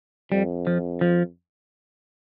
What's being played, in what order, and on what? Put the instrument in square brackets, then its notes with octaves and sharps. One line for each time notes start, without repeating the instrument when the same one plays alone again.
[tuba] F2 [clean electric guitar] G3
[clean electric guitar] F3
F3